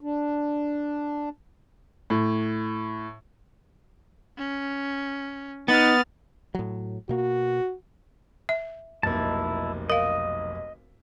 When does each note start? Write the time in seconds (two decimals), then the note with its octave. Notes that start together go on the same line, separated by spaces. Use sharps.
0.01 D4
2.10 A2
4.38 C#4
5.68 B3 D#4 F6 A6
6.55 A2 F#3
7.09 B2 A#3 F#4
8.49 E5
9.03 F1 B1 A#3 E4 A5
9.90 A#4 D#5 F5